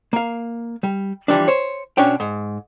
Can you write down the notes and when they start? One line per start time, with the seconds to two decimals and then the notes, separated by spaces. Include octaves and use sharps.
0.13 A#3 F5
0.83 G3
1.28 E3 F3 G3 A3 D4
1.48 C5 C#5
1.98 B2 C#4 D4 C#5 G5
2.20 G#2